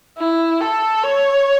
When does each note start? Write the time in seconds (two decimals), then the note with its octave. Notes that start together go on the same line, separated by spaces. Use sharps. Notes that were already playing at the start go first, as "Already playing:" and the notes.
0.18 E4
0.61 A4
1.03 C#5